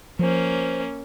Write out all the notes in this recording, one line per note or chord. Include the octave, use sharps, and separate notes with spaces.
F3 A#3 C#4 C5